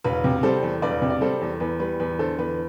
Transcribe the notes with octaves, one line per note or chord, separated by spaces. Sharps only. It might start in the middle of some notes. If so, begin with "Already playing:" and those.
E1 B4
C3
G3 A4 C5
E2
E1 B4 D5
C3
D5
G3 A4 C5
E2
E2 B4
G3 B4
E2 B4
D3 A4 C5
E2 B4